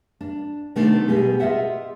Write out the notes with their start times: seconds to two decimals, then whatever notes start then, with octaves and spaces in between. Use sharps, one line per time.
0.21 D4
0.76 C3 D#3 A3 B3 D4
1.08 B2 G#3 B3 G4
1.40 F4 G#4 B4 D#5 E5 F#5